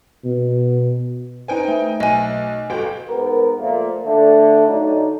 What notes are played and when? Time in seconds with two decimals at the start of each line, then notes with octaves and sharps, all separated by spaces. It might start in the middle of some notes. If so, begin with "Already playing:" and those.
0.24 B2
1.48 D#4 B4 C5 G5 G#5
1.68 A3 E5
2.00 B1 D#5 G#5
2.70 G1 F#4 A4 G5
3.09 G#2 B3 A#4
3.58 A#2 F3 A3 A#3
4.04 D3 A3
4.67 D3 F#3 D#4